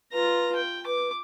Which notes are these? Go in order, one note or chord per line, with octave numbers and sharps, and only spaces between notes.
F4 B4 A#5
G5
B4 D6